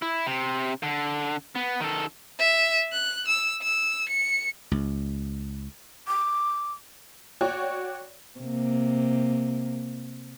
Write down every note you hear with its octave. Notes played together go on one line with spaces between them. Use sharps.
E4
C3
D3
B3
D#3 A4
E5
F#6
E6
E6
C#7
C#2
D6
F#4 C#5 D5 G5 C#6
C3 A#3